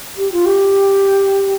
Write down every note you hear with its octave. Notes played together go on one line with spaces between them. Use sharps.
G4
F4
G4